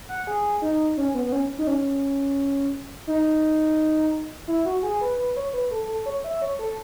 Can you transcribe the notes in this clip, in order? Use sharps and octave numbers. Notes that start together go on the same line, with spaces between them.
F#5
G#4
D#4
C#4
B3
B3
C#4
D#4
C#4
D#4
E4
F#4
G#4
B4
B4
C#5
B4
A4
A4
C#5
E5
C#5
A4